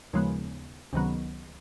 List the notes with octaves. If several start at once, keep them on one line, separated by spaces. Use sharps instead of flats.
D#2 C#3 F3 G#3 B3
C#2 C3 D#3 F#3 B3